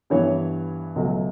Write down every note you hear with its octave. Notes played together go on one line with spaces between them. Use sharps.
G2 E3 B3 C#5
C#2 B2 F#3 A3